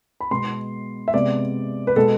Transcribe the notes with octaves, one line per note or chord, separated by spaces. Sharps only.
B5
B2 G#3 B3 C6
E5
C3 G#3 B3 D5
B4
B2 G#3 B3 A4